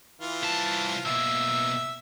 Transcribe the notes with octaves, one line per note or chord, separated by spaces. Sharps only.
E3 F4
C2 A5
B2 A#3 E5